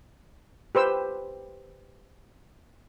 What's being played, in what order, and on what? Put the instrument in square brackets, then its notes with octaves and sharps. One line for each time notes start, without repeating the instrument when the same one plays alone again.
[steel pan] G4 B4 C5 E6